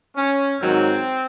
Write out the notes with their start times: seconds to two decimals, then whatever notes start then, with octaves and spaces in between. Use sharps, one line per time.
0.16 C#4
0.61 G#2 D#3 F#3 C4